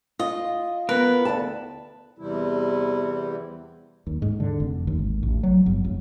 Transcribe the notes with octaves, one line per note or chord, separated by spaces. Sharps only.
F4 D#5
B3 A#4 B4
D2 A5
E2 C3 E3 G3 E4
D#2
G#2
D3
F1
D#2
G#1
A1
F#3
G1
F1